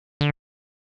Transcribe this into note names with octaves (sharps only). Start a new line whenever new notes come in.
D3